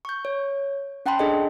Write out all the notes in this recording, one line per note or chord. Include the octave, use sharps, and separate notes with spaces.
C#6 G6
C#5
C#4 F#5 G5 A5 B5 C6
D4 G#4 A4 D#5